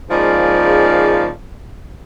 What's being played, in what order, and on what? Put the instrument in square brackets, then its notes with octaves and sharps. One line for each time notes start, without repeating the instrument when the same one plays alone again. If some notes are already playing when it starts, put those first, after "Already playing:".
[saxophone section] G#2 C#3 F3 G#3 A#3 D5